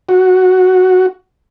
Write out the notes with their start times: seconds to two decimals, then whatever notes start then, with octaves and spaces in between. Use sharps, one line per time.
0.09 F#4